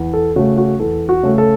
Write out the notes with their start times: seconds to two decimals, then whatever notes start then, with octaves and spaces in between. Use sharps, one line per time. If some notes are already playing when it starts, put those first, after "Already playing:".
Already playing: E2
0.13 A4
0.36 C#3 A3 F#4
0.58 F#4
0.80 E2 A4
1.09 F#4
1.23 C#3 A3
1.38 A4